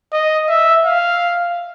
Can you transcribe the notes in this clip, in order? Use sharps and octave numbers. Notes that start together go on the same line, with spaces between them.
D#5
E5
F5